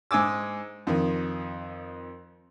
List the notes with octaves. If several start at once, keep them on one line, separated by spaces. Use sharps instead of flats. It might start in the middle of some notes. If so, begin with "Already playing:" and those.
G#2 G#5 D6 E6
F2 D#3